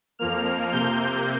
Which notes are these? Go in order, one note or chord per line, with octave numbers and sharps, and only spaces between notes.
F2 F3 A#3 F6
C3 A#3 G6